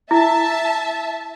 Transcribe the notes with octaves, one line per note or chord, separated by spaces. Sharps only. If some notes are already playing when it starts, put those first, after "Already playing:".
E4 E5 A5